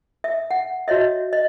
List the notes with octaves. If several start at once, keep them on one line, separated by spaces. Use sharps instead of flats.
E5
F#5
F#4 C#5 D#5 E5
D#5